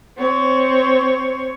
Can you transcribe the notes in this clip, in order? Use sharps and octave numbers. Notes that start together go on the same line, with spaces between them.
C4 C#5